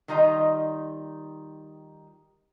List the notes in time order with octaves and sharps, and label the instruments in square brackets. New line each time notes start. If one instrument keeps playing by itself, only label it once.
[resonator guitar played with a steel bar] D#3 G3 D#4 F4 D#5 A#5